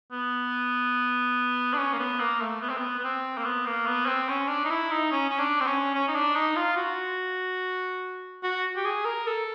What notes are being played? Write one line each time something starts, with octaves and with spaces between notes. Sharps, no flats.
B3
D4
C#4
A#3
B3
A#3
A3
B3
C4
B3
B3
C4
A#3
B3
A#3
B3
C4
C#4
D4
D#4
E4
D#4
C#4
C#4
D4
C4
C#4
C#4
D#4
D4
D#4
F4
F#4
F#4
G4
G#4
A#4
A4